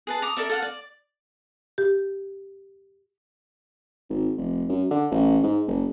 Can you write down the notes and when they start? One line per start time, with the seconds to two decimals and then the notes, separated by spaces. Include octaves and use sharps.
0.07 G#4 B4 A5
0.22 A#5 D6 D#6
0.37 A4 A#4 D5 E5
0.50 A4 F5 F#5
0.62 D5
1.78 G4
4.10 G#1
4.38 F1
4.69 F#2
4.91 D3
5.11 A1
5.43 G#2
5.67 F#1